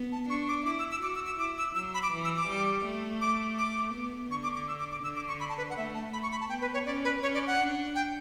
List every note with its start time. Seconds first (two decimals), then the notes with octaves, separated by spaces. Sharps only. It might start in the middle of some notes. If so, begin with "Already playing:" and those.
Already playing: B3
0.12 A5
0.29 D4 C#6
0.49 D6
0.66 E4 D6
0.79 E6
0.91 E6
1.02 F#4 D6
1.15 E6
1.27 E6
1.39 E4 D6
1.58 E6
1.75 F#3 E6
1.94 B5
2.03 D6
2.12 E3
2.24 E6
2.37 D6
2.49 G3
2.86 A3
3.21 D6
3.58 D6
3.94 B3
4.31 D3 C#6
4.43 D6
4.55 D6
4.68 E6
4.79 D6
4.91 D6
5.03 D3 E6
5.16 D6
5.28 C#6
5.40 B5
5.49 A5
5.58 B4
5.70 F#5
5.76 A3 E5
5.94 A5
6.13 A3 B5
6.23 C#6
6.32 B5
6.41 A5
6.49 B3 G5
6.61 B4
6.74 C#5
6.86 C#4 D5
7.04 B4
7.23 C#4 C#5
7.34 D5
7.47 F#5
7.59 D4
7.95 G5